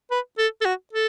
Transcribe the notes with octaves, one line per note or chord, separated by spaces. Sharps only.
B4
A4
A4
F#4
A4